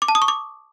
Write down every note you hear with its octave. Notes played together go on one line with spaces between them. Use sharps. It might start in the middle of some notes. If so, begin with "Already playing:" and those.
D6
A5
D#6
C#6
D6